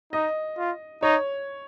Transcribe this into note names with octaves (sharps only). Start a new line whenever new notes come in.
D#4 D#5
F4
D#4 C#5